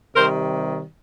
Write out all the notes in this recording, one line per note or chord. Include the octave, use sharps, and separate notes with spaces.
C3 D#3 G3 A#4 C5